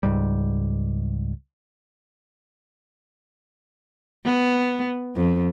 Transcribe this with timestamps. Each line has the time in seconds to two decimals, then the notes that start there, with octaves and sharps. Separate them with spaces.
0.03 C#2 G#2 G3
4.25 B3
5.16 F2